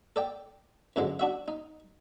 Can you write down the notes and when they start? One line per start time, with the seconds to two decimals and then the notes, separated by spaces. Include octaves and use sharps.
0.16 A4 D5 G5
0.96 F#2 A2 D3 F3 G#3
1.19 D4 F#4 E5
1.48 D#4